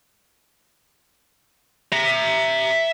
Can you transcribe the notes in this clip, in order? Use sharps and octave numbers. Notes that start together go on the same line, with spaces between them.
E5 A#5